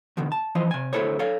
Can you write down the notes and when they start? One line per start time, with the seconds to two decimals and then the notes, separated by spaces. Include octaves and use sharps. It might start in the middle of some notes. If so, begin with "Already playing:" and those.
0.17 E2 B2 D3 D#3
0.32 A5
0.55 E3 F3 C5 D#5
0.71 C3 G#5
0.93 D2 A#2 E4 A4 C5 C#5
1.19 A4 C#5 F5